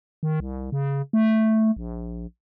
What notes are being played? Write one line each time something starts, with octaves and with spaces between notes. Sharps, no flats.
D#3
C2
C#3
A3
A#1